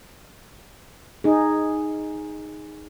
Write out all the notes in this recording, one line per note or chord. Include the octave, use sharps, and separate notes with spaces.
D#4 G#4